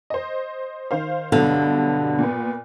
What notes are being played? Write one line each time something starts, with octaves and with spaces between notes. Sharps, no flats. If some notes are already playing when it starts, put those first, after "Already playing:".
C5 D#5
D#3 C5 F5
G2 B2 D3 F#3 F5
A#2 B3